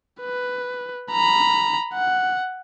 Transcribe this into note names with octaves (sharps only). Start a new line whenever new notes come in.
B4
A#5 B5
F#5